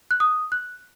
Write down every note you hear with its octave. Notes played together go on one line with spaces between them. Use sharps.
F#6
D#6
F#6